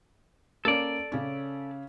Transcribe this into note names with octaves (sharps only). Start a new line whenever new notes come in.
A#3 C#4 A4 D5
C#3 C#4